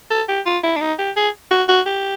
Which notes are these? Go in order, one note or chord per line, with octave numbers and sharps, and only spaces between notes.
A4
G4
F4
E4
D4
D#4
G4
G#4
F#4
F#4
G4